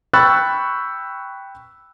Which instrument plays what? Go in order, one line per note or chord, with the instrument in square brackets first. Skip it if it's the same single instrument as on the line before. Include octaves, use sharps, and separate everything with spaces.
[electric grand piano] G5 B5 C#6 E6 F#6 A6